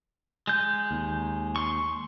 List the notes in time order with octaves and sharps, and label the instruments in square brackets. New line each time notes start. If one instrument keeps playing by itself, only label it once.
[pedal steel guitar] G#3 G6
[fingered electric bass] D#2
[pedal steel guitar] C6 C#6